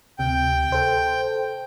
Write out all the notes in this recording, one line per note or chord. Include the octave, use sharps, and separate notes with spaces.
D2 C3 G5
A4 C5